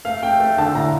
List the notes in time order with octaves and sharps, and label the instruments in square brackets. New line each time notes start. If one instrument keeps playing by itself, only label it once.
[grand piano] A3 [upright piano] F5
[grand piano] A3 [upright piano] G5
[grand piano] A3
[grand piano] D3 [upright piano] A5
[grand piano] A2 [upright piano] A#5